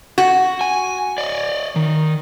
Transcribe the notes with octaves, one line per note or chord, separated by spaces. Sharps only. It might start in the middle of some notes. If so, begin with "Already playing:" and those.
F#4
G#5
D5 D#5
D#3